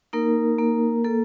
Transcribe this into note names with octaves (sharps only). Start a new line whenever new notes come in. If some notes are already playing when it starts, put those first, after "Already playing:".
A#3 D#4 A#4
A#3
A#3 A4